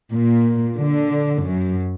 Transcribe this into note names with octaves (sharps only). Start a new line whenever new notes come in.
A#2
D3
F#2